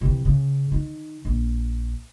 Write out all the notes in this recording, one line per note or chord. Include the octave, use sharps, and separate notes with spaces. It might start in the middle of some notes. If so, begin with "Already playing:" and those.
C3 E3
C#3
D#3
A#1